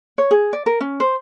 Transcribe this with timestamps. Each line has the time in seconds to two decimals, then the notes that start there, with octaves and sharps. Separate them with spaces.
0.18 C#5
0.31 G#4
0.53 D5
0.66 A#4
0.80 C#4
1.00 C5